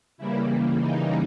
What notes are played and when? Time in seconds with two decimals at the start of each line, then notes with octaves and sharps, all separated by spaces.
0.18 C#3 E3 G3 A#3 E4
0.78 D#4